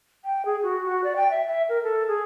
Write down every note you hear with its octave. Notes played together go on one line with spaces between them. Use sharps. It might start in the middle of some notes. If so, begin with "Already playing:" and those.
G5
G#4
F#4
F#4
D5
G5
E5
E5
A#4
A4
G#4